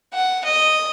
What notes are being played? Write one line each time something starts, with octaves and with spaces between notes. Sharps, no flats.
F#5
D#5